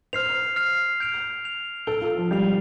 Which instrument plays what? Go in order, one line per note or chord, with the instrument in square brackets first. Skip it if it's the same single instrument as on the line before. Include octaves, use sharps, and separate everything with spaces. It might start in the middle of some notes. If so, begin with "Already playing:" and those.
[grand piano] C5 [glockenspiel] F6 C7 F7
[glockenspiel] F6 C7 F7
G6 D7 F7
G6 F7
[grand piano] A4 [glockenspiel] G6 D7 G7
[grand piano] F4
F3
[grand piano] G3 [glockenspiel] G6 C7 F7